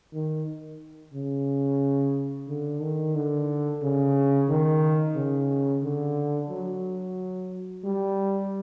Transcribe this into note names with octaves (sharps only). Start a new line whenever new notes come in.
D#3
C#3
D3
D#3
D3
C#3
D#3
C#3
D3
F#3
G3